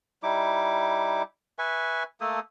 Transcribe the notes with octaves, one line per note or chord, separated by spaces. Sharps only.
G3 D#4 E4 D6
B4 E5 G#5 C#6
A3 A#3 A4 D#6